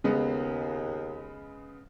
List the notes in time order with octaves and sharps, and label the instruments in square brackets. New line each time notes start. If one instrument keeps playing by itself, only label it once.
[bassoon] D#2 [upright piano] C#3 G#3 B3